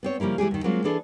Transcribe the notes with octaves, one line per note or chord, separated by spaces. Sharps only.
B3 C4 C#5
C#3 F3 G3 A#3 E4
E3 G#3 G4 G#4
D#2 D#3
F#3 G#3 A#3 C4 F4
E3 D4 G#4 A4